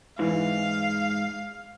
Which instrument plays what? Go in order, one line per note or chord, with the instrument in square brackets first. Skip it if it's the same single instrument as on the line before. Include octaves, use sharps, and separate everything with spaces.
[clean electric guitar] G#2 [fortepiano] E3 [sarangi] F5